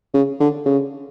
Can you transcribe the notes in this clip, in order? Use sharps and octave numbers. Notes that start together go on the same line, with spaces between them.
C#3
D3
C#3